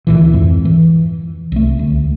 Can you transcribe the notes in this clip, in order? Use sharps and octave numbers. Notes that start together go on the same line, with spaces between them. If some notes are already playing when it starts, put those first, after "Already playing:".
D2 A#2 E3
F2 G#2
E3
C2 A3
D2